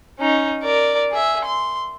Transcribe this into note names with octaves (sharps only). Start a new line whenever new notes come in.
C#4 D#4
A#4 D5
G#4 E5
C6